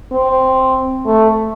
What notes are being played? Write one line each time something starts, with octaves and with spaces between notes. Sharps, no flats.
C4
A3